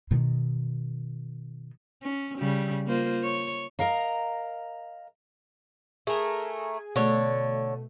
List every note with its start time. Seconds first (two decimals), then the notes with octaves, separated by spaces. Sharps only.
0.11 B2 D#3
2.03 C#4
2.39 C#3 G3
2.87 A#3 F4 C5
3.23 C#5
3.79 A#4 D#5 F5 A#5
6.07 A3 G#4 A#4 G#5
6.96 B2 D3 A3 C#5